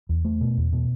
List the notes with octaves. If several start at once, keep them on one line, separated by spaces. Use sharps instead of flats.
E2
A3
B2
E2
B2